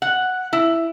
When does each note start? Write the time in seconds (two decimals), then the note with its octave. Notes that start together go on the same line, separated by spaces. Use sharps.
0.02 F#5
0.53 E4